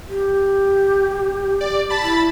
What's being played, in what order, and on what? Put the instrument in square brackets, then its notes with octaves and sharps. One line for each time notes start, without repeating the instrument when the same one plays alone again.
[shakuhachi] G4
[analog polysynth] D5
A5 B5 A6
[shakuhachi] E4